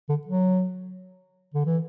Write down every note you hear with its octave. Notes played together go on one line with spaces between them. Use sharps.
D3
F#3
D3
E3